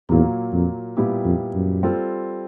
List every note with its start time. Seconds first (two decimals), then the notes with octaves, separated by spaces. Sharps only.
0.09 E2 A#2 F#3 A#3
0.53 F2
0.97 A#2 G3 B3 E4 G4
1.25 F2
1.54 F#2
1.83 G3 C4 F4 A4